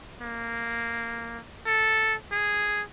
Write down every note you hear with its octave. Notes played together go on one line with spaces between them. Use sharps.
A#3
A4
G#4